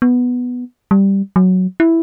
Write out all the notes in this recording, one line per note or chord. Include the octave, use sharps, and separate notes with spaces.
B3
G3
F#3
E4